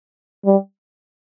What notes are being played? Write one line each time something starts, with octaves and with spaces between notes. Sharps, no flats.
G3